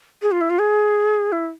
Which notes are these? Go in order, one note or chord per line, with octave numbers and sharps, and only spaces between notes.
G#4
F4
E4
F4
G#4
E4